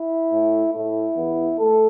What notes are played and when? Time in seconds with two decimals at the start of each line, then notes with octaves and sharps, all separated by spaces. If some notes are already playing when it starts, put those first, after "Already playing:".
Already playing: E4
0.29 A2 A3
0.72 A2 A3 E4
1.15 E2 E3 B3
1.58 A3 A4